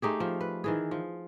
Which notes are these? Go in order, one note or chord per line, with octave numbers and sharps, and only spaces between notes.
A3 D#4 G4 G#4
F3
B4
D#3 E3 G#4
F3